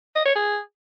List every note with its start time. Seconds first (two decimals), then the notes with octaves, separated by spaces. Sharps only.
0.15 D#5
0.25 C#5
0.35 G#4